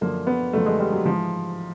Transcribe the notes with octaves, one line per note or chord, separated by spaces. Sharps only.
F#2 D3 F3 A#3
B3
F#2 D3 F3 A3
G#3
G3
F#3
G#2 E3 F3